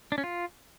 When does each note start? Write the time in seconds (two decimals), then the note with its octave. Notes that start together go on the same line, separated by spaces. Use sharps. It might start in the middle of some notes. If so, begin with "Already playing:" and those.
0.12 D4
0.18 C#4
0.24 F4